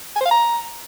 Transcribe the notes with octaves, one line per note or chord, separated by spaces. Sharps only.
G#5
C5
F5
A#5